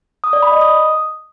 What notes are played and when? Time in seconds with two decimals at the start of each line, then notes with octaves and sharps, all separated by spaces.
0.24 D#6
0.33 D5
0.42 B5
0.52 D#5
0.61 D#6